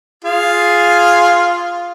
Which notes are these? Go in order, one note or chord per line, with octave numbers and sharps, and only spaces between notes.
F4 G#4 F5